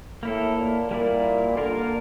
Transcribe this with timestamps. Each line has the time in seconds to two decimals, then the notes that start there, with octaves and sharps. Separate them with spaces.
0.23 A2 A#3 E4 A4
0.58 A#2
0.91 A#2 G3 A#3 E4 A#4 D5
1.57 D3 A#3 F4 A#4